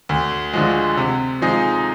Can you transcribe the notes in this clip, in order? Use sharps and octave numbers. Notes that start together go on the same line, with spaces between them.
D2
D3 F3 G#3
C3
F3 G#3 D#4 G#4